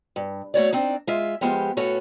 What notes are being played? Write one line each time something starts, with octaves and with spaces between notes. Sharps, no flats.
G2
A3 F#4 C#5 D5
C4 D4 D#4
G#3 F4 E5
F3 G#3 B3 F4 G4
A2 C#4 F#4 A4 B4 C#5